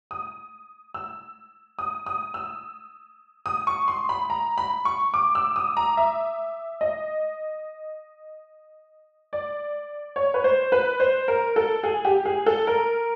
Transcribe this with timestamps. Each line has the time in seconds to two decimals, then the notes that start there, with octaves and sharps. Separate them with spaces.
0.11 D#6
0.94 E6
1.79 D#6
2.06 D#6
2.34 E6
3.46 D#6
3.67 C#6
3.88 C6
4.09 B5
4.30 A#5
4.58 B5
4.85 C#6
5.14 D6
5.35 E6
5.56 D#6
5.77 A#5
5.97 E5
6.81 D#5
9.33 D5
10.16 C#5
10.34 B4
10.44 C5
10.72 B4
11.00 C5
11.28 A#4
11.56 A4
11.83 G#4
12.05 G4
12.25 G#4
12.46 A4
12.67 A#4